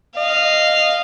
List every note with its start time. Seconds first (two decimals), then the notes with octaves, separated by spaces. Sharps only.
0.17 D#5 F5